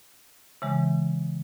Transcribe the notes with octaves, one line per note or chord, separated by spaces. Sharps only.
C#3 E3 G#3